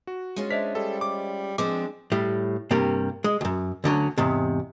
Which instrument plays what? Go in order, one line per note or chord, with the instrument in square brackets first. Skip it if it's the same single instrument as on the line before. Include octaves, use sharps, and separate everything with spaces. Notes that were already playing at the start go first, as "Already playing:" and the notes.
[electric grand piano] F#4
[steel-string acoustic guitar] G#3 C#4 F4
[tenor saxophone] D4 [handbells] C5 D#5 E5 [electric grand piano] B6
[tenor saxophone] G3 [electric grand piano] A4
[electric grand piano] D6
[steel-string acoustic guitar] F3 C4 D4 [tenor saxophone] G#3 [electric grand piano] D6
[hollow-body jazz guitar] A2 G3
G2 C3 G3 A#3
G#3
C#2 F#2
D2 D3 F#3 C#4
E2 G#2 C3